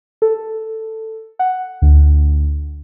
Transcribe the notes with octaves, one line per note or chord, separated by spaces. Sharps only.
A4
F#5
D2